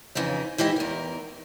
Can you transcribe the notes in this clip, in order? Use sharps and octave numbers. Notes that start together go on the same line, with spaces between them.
F2 C#3 E3 D#4
G#2 E3 E4 G4 D#5
E2 A#4